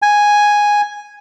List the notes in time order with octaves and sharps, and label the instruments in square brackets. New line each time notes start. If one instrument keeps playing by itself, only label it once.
[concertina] G#5